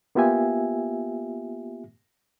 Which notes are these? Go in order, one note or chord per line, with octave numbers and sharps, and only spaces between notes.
A#3 B3 F4 G4 E5 G#5